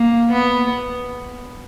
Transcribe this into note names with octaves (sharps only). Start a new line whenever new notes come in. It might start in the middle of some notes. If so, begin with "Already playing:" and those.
Already playing: A#3
B3